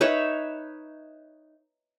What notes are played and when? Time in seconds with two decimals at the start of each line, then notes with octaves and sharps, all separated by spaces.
0.01 D#4 B4 C#5 E5